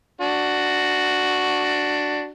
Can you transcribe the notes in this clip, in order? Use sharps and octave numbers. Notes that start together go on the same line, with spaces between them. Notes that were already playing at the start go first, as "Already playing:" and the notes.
D4 F#4